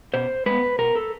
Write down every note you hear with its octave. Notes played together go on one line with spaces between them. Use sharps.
B2 C5
G#3 B3 B4
B2 A#4
A4